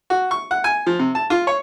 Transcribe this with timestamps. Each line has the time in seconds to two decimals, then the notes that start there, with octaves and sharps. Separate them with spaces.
0.10 F#4
0.31 C#6
0.51 F#5
0.64 G#5
0.86 F3
0.99 C3
1.15 A5
1.30 F4
1.47 C#5